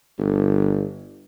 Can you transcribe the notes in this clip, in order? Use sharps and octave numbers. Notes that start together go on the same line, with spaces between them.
G1